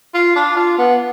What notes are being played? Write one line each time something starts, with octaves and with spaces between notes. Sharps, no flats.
F4
D4
F4
B3